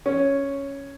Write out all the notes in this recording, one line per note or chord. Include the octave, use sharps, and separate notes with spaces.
C#4